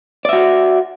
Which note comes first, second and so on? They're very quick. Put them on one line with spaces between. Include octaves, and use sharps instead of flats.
D5 E5 F#4